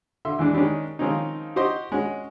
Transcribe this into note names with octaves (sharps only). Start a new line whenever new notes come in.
D3 E5 C6
E2 E3 G#3 D4
D#3 G#3 C#4 D4 G4
D#3 F3 G#3 C4 C#4 D#4
F#4 G4 C5 D#5 C6
G#3 C#4 F#4